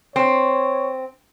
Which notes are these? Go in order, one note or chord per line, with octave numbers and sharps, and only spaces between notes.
C4 C#5